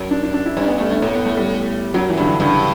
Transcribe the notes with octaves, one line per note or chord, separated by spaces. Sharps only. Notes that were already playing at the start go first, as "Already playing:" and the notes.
Already playing: F#2
D4
D4
D4
E4
G2 C#4
B3
A3
A3
A2 B3
B3
A3
G3
F#2 F#3
E3
G2 D3
E3
G2 C#3